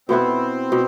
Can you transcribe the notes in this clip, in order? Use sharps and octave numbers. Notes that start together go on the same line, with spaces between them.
B2 B3 C4 E4 B4
B2